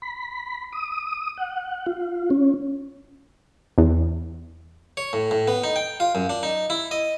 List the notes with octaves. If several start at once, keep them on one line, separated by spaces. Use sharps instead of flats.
B5
D#6
F#5
F4
C#4
E2
C#5
A2
A2
B3
D#4
G5
F4
F#2
D4
D#4
E4
D#5